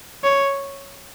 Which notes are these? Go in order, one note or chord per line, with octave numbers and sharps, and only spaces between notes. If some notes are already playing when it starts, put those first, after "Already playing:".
C#5